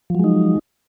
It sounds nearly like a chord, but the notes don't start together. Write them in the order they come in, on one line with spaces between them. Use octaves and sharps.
F3 F#3 G#3 D#4